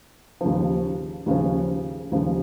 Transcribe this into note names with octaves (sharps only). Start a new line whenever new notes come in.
D#2 C#3 F3
D#2 C#3 F3
D#2 C#3 F3